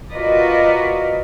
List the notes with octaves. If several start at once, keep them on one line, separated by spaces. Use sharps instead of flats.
F4 F#4 A#4 B4 D5 D#5